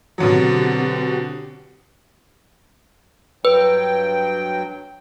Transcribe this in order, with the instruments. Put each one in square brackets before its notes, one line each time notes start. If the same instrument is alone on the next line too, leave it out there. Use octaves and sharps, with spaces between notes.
[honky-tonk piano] B2 D3 F#3 [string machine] C4 G4
[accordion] G2 F#3 G5 [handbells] B4